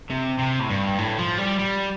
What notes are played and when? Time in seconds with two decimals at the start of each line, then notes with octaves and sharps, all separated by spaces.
0.10 C3
0.39 C3
0.60 A2
0.70 G2
0.98 A2
1.18 F3
1.38 G3
1.59 G3